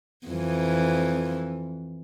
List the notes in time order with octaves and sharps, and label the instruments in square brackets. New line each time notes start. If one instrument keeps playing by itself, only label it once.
[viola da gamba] F2 E3